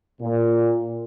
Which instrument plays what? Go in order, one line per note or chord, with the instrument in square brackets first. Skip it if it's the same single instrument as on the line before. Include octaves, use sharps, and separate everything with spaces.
[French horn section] A#2